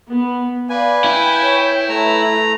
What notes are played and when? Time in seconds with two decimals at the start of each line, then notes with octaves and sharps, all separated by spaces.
0.11 B3
0.69 B4 D5 F5 G#5
1.04 E4 G5
1.43 C#5
1.89 A3 B4 E5 A#5